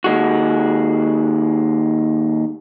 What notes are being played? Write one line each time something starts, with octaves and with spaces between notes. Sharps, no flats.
D#2 G#3 F#4